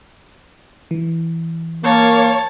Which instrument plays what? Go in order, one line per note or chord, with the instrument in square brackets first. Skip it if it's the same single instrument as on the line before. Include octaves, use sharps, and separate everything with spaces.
[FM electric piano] E3
[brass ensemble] A#3 [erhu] C#5 [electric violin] A5